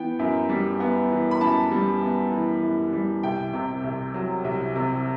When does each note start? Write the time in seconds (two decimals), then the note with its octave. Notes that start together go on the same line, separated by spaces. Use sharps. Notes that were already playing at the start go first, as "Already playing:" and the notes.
Already playing: E3 B3 G5
0.19 F#2
0.49 G3
0.80 B3
1.10 E3
1.31 B5
1.41 F#2 A5
1.71 G3
2.02 B3
2.32 E3
2.63 F#2
2.93 G3
3.23 C2 G5
3.54 C3
3.84 C2
4.14 F#3
4.44 C2
4.76 C3